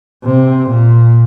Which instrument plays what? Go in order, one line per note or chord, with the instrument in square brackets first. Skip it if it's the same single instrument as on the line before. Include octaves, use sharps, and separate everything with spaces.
[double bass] C3
A#2